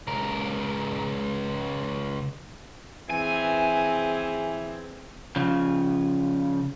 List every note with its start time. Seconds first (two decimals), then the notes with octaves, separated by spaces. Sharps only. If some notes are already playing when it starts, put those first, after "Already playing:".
0.07 C#2 A#4
3.10 E3 C4 G#4 G#5
5.36 C#3 F3